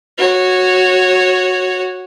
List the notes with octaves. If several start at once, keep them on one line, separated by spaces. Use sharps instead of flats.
F#4 C#5